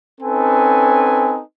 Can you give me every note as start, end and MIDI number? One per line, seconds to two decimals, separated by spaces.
0.21 1.41 60
0.21 1.41 61
0.21 1.41 63
0.21 1.41 69
0.21 1.41 71
0.21 1.41 80